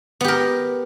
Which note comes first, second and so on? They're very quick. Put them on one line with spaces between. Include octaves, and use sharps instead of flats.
B3 G4 A#4